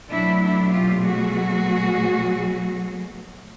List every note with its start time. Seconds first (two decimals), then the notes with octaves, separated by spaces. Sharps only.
0.11 B2 F#3 A3 D4 E4
0.42 D4 E4
0.73 F4 G4
1.03 F#4 G#4